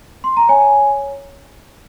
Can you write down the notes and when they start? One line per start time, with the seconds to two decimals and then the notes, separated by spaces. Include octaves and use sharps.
0.24 C6
0.37 A#5
0.49 C#5 G#5